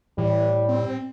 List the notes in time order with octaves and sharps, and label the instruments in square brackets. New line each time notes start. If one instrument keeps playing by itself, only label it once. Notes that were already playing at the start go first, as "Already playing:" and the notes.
[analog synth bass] A2 [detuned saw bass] E3 [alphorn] G3
[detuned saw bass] C4